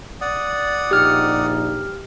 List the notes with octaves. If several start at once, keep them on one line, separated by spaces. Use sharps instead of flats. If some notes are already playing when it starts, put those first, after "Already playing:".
D5 F#5 D#6
A#1 D#4 G4 F6